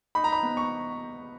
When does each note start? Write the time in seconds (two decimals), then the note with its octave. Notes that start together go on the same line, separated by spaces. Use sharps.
0.15 D#4 B5
0.24 A#5
0.33 B5
0.43 B3
0.57 C#6